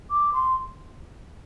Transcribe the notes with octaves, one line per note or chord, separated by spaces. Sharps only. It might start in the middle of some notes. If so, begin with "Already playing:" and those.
D6
C6